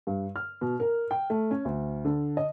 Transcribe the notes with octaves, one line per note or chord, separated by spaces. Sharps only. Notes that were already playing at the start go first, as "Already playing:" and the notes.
G2
F6
B2
A#4
G5
A3
C#4
D2
D3
D#5